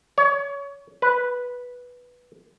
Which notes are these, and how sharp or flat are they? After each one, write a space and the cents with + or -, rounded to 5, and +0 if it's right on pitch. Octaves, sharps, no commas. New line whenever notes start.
C#5 +25
B4 -5